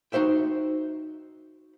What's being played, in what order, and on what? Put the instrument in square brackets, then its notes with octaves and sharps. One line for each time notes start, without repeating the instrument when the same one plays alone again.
[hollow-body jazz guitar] D#4 F#4 C5 E5 G5